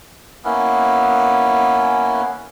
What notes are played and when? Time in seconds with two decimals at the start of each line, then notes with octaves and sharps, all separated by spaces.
0.45 A#3 B3 C#4 E4